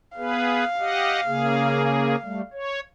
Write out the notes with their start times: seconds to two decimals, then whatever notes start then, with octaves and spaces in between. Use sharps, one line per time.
0.17 B3 G#4 B4 F5
0.80 G4 D#5 F#5
1.27 C#3 A#3 G#4
2.23 G3 A3
2.53 C#5